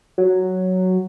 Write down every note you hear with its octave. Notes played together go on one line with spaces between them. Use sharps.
F#3